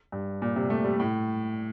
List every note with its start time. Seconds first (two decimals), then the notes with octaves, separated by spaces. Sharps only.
0.12 G2
0.42 A#2
0.56 C3
0.70 A3
0.84 G3
1.00 A2